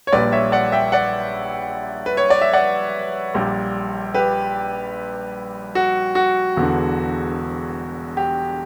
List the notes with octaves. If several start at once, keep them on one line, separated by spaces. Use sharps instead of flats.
C#5
A#1 A#2 G3 B4 D5
C#5 E5
D5 F#5
E5 G5
D5 F#5
B4
C#5
D5
E5
D5 F#5
A#1 A#2 G3
G4 B4
F#4
F#4
E1 E2 D3
G4